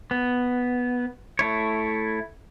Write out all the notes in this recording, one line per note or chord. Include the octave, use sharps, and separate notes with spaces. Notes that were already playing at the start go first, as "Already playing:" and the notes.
B3
A3 E4 C#5